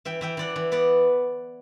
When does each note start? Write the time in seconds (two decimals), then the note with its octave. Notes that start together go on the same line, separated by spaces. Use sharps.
0.05 E3 E5 G5
0.21 E3 E5 G5
0.37 E3 D5 F#5
0.56 E3
0.72 B3 B4 D5